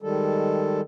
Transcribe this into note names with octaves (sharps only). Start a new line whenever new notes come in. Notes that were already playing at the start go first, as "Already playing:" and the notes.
D#3 G3 G#3 A4